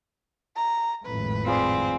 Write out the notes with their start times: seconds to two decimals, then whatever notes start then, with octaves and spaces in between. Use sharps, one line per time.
0.56 A#5
1.06 G#1 F2 A2 B4
1.46 C4 F4 G#4 D5